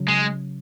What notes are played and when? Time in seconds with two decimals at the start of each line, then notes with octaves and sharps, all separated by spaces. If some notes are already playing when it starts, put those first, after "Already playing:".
Already playing: C#3 F#3
0.08 G#3